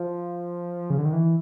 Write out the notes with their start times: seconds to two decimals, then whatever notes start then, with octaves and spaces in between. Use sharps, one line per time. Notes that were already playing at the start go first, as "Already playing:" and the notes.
Already playing: F3
0.90 C#3
0.99 D3
1.05 D#3
1.13 E3